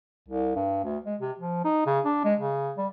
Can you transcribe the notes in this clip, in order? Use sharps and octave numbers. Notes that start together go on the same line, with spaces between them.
C2
G2
D2
G#3
C3
F3
D#4
C#3
D4
G#3
C#3
G3